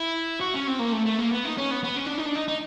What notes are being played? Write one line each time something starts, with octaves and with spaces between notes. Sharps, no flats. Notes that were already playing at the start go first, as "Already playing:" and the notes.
Already playing: E4
F#4
C#4
C4
A#3
A3
A3
A#3
B3
D#4
C#4
B3
B3
C#4
D4
D#4
D4
D#4
D#4